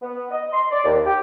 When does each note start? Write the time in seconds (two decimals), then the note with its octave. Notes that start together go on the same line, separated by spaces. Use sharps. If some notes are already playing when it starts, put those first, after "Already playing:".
0.02 B3
0.31 D#5
0.53 C6
0.71 D5
0.85 D#2
1.05 G4